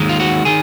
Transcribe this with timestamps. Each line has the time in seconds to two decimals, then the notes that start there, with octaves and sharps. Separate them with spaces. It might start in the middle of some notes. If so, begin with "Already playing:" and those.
Already playing: D#2 D#3 G#3
0.09 F4
0.20 F#4
0.45 D#3 G#4